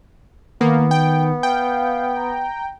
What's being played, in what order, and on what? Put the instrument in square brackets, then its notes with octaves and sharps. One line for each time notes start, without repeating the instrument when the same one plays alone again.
[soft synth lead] D#3 [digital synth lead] A#3 [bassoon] B3
[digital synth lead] G5
[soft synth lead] F5 [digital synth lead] G5
[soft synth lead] A#5